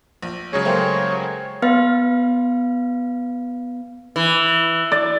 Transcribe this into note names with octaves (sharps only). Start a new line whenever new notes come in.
A#1
C#3 F#3 G#3 C#5
A3 A#3 G4 C5 G5 C6
B3 B4 F5
E3
D5